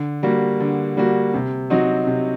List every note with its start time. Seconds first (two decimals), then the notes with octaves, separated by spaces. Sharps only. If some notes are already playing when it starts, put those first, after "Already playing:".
Already playing: D3
0.23 G3 A#3 F#4
0.60 D3
0.97 G3 A#3 F#4
1.34 C3
1.70 F#3 C4 D#4 F#4
2.07 C3